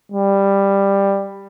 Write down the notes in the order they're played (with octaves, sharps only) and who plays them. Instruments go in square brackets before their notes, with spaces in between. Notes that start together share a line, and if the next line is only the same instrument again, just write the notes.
[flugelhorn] G3